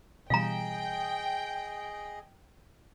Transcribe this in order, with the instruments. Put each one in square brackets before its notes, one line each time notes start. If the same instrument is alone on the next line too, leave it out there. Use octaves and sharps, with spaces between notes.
[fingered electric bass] B2 E3 G3 [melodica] G#4 D#5 [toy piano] F5 A#5 [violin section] G5